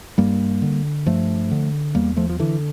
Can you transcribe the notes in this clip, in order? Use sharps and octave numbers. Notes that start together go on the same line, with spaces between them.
G2 G3 A#3
D3
G2 F3 A3
D3
E2 G3 A#3
F3 A3
F3
D3 E3